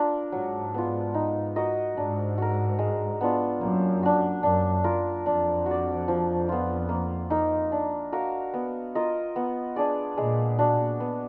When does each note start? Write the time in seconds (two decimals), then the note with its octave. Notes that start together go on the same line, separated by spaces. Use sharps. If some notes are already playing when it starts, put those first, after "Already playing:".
Already playing: D4 F4 A#4
0.32 G#2 F#3
0.74 B3 F4
1.14 D#4
1.56 F#4 A#4 D#5
1.96 G#2 D4
2.38 F#4 A#4
2.79 G#3
3.21 B3 D4 F4
3.61 F#2 A#3
4.03 D4 F#4
4.43 F#2 D4
4.84 F4 A#4
5.26 F2 D4
5.66 F#4 D5
6.08 F3
6.49 B3 F4
6.89 A#3
7.30 D#4 A#4
7.72 D4
8.13 F#4 A#4 F5
8.54 B3
8.95 F4 A#4 D#5
9.36 B3
9.76 D4 G#4 D5
10.17 A#2 G#3
10.59 D4 F#4
11.00 B3